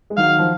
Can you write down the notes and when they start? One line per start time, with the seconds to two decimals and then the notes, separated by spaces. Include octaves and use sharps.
0.10 G#3
0.17 D#3 F#3 F5
0.39 F3